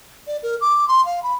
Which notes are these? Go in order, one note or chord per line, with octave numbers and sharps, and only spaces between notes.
D5
A#4
D6
C6
F5
B5